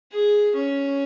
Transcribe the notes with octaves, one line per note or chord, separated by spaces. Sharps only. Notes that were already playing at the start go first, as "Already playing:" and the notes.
G#4
C#4